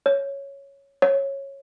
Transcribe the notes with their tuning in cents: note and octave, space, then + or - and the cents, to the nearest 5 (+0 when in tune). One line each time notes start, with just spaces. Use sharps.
C#5 +0
C#5 -15